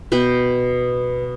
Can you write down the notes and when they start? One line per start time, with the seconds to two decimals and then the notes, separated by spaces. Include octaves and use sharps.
0.12 B2 B4 G5